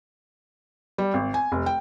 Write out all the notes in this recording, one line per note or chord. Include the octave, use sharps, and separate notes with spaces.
G3
G#1
G#5
F1
G5